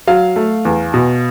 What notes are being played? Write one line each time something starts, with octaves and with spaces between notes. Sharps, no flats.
F#3 F5
A3
E2
B2